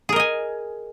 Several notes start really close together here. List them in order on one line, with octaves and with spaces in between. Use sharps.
G#4 A#4 D#5 G#5